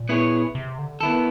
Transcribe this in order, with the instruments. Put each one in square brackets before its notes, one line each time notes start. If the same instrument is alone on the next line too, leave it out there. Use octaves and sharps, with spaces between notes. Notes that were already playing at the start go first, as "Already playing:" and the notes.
Already playing: [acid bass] A#2
[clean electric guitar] B3 E4 G#4 C#5
[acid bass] C3
D3
[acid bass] D#3 [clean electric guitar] B3 E4 A4